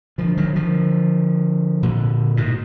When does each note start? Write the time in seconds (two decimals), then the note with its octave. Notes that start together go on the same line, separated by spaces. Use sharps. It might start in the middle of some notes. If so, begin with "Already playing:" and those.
0.18 D3 F3
0.37 D#3 F#3
0.55 D3 F3
1.83 A#2 D3
2.37 G#2 B2